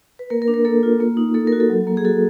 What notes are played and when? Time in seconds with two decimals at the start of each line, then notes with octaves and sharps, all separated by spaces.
0.19 B4
0.30 A#3 A#4
0.42 A#4
0.48 D4
0.54 A#4
0.65 A#3 A4
0.83 F4
1.00 A#3
1.17 D#4
1.34 A#3 A4
1.47 F#4 A#4
1.60 A4
1.70 F#3
1.87 A#3
1.97 G#4
2.04 F#4 A4